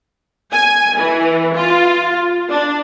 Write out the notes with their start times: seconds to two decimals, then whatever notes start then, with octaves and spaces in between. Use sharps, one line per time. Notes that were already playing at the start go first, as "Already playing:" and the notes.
0.51 G#5
0.98 E3
1.54 F4
2.49 D4